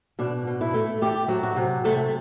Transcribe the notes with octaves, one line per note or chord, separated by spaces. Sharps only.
B2 D4
B2
E4
A3
A3 G4
F#3
F#4
C3
C3 A3